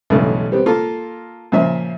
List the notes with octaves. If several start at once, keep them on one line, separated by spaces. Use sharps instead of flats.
B1 E2 G2 C#3 A3
G3 B3 C4
A#3 F4 A4
A#2 C#3 F3 E5